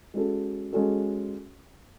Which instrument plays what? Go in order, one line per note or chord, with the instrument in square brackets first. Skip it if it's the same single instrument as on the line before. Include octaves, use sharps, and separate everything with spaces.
[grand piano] G#3 C#4 F#4 A4
G#3 C#4 F#4 A4